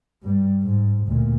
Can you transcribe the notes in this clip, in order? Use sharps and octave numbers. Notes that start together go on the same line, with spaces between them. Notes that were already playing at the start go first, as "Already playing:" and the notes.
G2 G3
G#2
D2 A#2